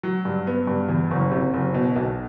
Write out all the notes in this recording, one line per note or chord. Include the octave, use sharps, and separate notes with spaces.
F#3
G2
B3
G2
E2
F#1
C3
F#1
B2
B1